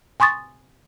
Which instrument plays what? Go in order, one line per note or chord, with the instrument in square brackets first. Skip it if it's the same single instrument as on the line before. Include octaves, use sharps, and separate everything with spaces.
[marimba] G#5 C6 C#6 D#6 A6